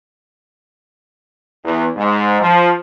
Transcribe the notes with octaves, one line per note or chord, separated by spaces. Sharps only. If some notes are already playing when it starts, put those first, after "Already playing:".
E2
G#2
F3